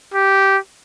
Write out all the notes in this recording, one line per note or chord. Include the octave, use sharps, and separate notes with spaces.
G4